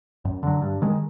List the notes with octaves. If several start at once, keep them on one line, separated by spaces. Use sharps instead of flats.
F#2
D3 F#3
G2
D#3 G#3